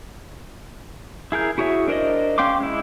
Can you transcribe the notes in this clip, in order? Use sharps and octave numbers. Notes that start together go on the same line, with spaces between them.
E4 G#4 A#4 G6
E4 F#4 G#4 C#5 E5
D4 A#4 C5 D5 D#5
C#4 F5 G5 C6 D6
G#3 E4